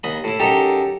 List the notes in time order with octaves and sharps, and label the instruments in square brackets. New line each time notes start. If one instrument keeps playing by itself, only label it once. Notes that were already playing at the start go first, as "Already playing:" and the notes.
[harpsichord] D#2 D#5 B5
A2 E4
[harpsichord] F#2 D#4 A4 [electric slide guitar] G4